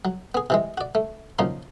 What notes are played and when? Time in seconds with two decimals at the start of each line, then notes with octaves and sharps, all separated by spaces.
0.05 F#3
0.35 B3 G#4
0.50 C3 E3 G#3
0.78 F#4 D5
0.95 A3
1.39 C#3 F3 F#3 A#3 D#4